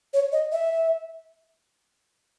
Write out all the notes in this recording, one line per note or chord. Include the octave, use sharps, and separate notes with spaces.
C#5
D#5
E5